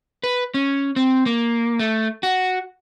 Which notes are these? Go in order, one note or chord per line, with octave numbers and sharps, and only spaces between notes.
B4
C#4
C4
A#3
A3
F#4